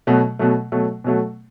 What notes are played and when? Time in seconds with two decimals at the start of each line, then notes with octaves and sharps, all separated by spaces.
0.07 B2 F#3 A3
0.39 B2 F#3 A3
0.72 B2 F#3 A3
1.04 B2 F#3 A3